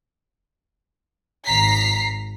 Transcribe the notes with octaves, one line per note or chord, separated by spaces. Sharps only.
G#1 A#5 B6 C7